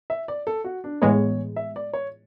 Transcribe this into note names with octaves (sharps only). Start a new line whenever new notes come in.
E5
D5
A4
F#4
D4
A2 E3 G#3 B3 C#5
E5
D5
C#5